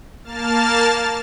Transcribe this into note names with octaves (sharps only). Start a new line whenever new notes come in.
A#3 A5 F6 A6